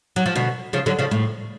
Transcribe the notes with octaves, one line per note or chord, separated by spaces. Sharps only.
F#3
F3
B2 D3
C#3 F3
D3 F#3
C#3 F3
A2